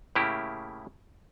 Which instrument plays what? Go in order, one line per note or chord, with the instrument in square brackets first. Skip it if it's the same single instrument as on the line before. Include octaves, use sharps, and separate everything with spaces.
[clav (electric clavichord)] A2 C#3 A#3 E4 G4